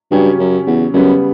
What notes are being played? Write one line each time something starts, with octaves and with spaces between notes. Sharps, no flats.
G2 C#3 F#3 C#4 G4
F#2
E2
F#2 C#3 G3 B3